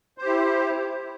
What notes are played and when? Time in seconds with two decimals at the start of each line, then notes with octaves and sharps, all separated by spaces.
0.18 C5
0.22 G4
0.26 E4